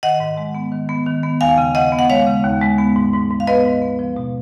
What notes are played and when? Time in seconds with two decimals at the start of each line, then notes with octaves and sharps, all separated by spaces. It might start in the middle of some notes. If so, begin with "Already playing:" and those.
0.03 D#3 D#5 F#5
0.20 G#2
0.37 G#3
0.55 B3
0.72 D#3
0.89 B3
1.06 D#3
1.23 B3
1.41 D#2 F5 G#5
1.58 C#3
1.75 C#3 D#5 F#5
1.92 B3
1.99 F#5
2.10 G#3 C#5 F5
2.27 C#3
2.44 D#2
2.62 G#3
2.78 B3
2.96 G#2
3.13 G#2
3.30 G#2
3.40 F5
3.47 B3 B4 D#5
3.65 G#2
3.82 B3
3.99 F3
4.16 B2